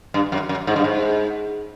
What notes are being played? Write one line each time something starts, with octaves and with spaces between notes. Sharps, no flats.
G2
F#2
F#2
G#2
G2
G#2